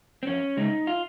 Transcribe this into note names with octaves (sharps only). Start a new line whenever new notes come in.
C4
F2 C#4
C#3 G#3 D#4
F4